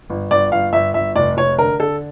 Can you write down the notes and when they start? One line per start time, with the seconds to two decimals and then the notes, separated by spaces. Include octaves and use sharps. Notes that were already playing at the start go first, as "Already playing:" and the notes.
0.10 G1
0.31 G1 D5
0.52 G1 F5
0.73 G1 E5
0.94 G1 E5
1.15 F1 D5
1.37 F1 C#5
1.58 D3 A#4
1.79 D3 A4